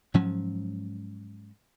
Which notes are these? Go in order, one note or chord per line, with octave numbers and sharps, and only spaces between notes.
G#2 F3 F#3 C#4